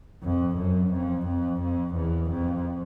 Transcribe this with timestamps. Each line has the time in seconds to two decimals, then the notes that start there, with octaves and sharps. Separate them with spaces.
0.23 F2
0.57 F#2
0.92 F2
1.26 F2
1.61 F2
1.95 E2
2.30 F2